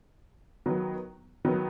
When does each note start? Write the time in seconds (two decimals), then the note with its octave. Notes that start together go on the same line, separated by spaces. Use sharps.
0.66 D#3 F#3 B3
1.45 D#3 F#3 B3